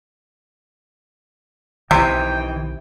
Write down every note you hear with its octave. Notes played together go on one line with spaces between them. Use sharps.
B1 C3 D#3 E3 G5